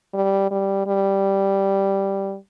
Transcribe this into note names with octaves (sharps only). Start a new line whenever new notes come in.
G3
G3
G3